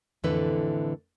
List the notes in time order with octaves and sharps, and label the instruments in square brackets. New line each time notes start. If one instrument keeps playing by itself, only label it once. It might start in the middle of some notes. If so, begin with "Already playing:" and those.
[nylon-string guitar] F2 A2 D3 E3 A4 B4